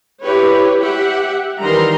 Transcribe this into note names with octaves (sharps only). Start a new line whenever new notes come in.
E4 G4 B4 C#5
G4 E5 F#5
D#3 E3 G3 A#4 A#5 C6